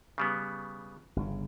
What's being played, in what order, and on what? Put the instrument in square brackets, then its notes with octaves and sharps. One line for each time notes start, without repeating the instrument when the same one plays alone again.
[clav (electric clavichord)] C#3 G3 B3
[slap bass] G1 C#3